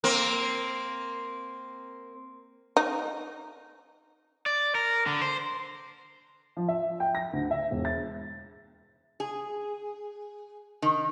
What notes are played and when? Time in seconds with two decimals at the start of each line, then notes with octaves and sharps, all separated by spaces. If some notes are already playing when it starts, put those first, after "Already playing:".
0.04 A#3 C4
2.77 D#4
4.46 D5
4.75 A#4
5.07 D3
5.22 C5
6.57 F3
6.68 E5
7.00 G5
7.15 A#6
7.33 D2
7.51 E5
7.71 E1
7.85 A6
9.20 G#4
10.82 D#3